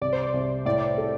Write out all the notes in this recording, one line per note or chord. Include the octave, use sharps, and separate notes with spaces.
C2 D5
C5
D5
C2
A2 D5
A4